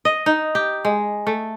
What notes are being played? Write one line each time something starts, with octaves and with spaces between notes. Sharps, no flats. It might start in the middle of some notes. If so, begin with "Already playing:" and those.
D#5
D#4
G4
G#3
A3